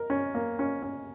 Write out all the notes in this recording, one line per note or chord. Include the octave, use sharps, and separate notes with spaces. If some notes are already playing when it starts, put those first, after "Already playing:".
Already playing: A#4
C#4
A#3
C#4
C#4